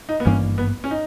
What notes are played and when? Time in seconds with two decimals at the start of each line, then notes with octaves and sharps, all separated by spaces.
0.09 D#4
0.20 B3
0.25 G#1 G2 E3 A#3 C#4
0.58 B3
0.84 C#4
0.91 D#4